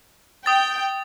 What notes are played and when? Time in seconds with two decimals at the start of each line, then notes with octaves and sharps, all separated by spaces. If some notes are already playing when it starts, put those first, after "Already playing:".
0.46 G5 D#6 A6